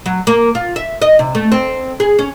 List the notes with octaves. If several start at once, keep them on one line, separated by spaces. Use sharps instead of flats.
F#3
A#3
F4
E5
D#5
C3
A3
C4
G#4
C#4